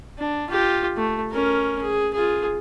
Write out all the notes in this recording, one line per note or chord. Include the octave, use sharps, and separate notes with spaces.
D4
F4 G4
A3
C#4 A#4
G#4
F4 G#4